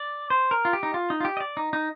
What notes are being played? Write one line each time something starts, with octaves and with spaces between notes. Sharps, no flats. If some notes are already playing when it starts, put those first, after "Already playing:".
Already playing: D5
C5
A#4
F4
G4
D#4
F4
D#4
F4
G4
D#5
D5
D#4
D#4